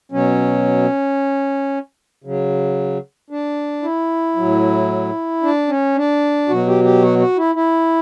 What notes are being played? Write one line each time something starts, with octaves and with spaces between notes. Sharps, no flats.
B2 F#3 C#4
C#3 F#3
D4
E4
A2 F#3
D4
C#4
D4
B2 F#3 F#4
G4
G4
F#4
F#4
E4
E4